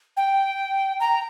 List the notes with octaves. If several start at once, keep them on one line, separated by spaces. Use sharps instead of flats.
G5
A#5